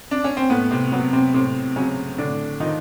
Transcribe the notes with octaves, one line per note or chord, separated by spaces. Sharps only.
D4
C#4
C4
A2 B3
C3 C4
F#3 B3
C3 C4
A2 C3 C4
C#3 F#3 C#4
A2 D3 D4
D#3 F3 D#4